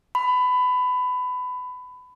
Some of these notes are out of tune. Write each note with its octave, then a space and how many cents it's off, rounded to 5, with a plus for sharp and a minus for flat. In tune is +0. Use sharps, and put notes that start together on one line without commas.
B5 +20